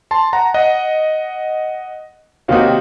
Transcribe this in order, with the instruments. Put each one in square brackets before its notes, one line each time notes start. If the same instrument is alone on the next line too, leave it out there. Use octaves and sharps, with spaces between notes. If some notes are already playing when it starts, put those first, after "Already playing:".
[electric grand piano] A5 C6
F#5 A#5
D#5 F#5
[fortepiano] C3 D#3 A#3 D#4 F#4 [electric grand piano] C#5 F5